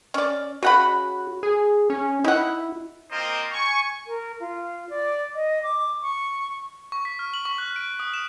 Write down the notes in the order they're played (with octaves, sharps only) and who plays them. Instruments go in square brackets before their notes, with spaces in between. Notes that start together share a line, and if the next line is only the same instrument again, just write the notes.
[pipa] C#4 D5
[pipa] C#3 F#5 B5 [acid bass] F#4
[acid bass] G#4
C#4
[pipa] D#4 F#5 [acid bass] E4
[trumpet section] A#3 C4 F4 A#4 C5 D#5
G#5 C#6
[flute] A#4
F4
D5
D#5
D6
C#6
[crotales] C#6
B6
F6
F#7
C#6
F#6
D7
D#6
E7